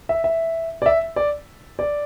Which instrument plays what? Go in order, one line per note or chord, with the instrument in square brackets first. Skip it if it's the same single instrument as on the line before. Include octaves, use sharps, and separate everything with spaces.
[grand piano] E5
E5
D5
E5
D5
D5